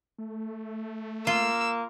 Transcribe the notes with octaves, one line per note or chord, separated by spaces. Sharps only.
A3
A#3 F4 E6